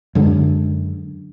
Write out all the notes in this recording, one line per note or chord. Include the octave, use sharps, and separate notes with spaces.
F#2 D3 G#3